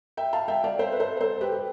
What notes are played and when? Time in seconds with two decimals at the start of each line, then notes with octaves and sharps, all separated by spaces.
0.17 E5 G5
0.33 F5 A5
0.48 E5 G5
0.64 D5 F5
0.79 C5 E5
0.92 B4
1.00 A4 C5
1.20 A4 C5
1.41 G4 B4
1.52 G4